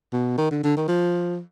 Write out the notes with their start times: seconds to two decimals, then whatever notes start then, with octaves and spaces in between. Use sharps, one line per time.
0.13 B2
0.37 D#3
0.51 D3
0.63 D3
0.76 D#3
0.88 F3